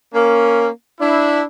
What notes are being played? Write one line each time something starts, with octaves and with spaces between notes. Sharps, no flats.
A#3 C#4
D4 E4